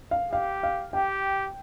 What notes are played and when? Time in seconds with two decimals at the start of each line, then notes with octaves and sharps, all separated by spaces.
0.11 F5
0.32 G4 F5
0.63 F5
0.93 G4 G5